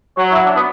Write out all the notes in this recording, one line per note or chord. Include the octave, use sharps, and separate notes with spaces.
F#3 C#5
E4
D4
B3